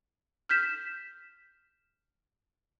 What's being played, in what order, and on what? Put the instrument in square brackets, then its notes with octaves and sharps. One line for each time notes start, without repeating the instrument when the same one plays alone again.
[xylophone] F6 G6 B6 E7